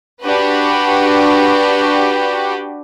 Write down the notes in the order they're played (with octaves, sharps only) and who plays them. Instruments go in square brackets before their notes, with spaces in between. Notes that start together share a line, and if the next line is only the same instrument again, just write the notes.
[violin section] D4 F#4 G4 B4